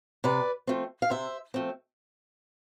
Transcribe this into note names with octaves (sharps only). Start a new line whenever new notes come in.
C3 B4 D5
F3 A3 C4
F5
C3 C5 E5
F3 A3 C4